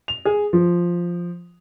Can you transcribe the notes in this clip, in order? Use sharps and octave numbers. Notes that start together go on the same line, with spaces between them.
F7
G#4
F3